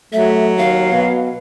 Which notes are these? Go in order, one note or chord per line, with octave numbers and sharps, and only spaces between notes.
F#3 A3 E5
D#2 F5
B2